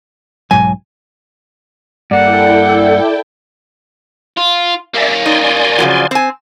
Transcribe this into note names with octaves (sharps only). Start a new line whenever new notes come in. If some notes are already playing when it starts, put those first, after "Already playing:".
B1 G#2 F#3 G#5
G2 A#3 E4 A4 D5 F#5 G5
F4
A#3 C#4 D5 E5
D#4 D5 G#5 C6
C#3 F3 F#3
C4 G#5